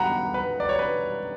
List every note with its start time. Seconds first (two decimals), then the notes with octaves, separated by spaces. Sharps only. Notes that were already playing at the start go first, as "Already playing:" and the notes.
Already playing: F#5 A#5 B5
0.34 B4
0.60 D5
0.69 C#5
0.79 B4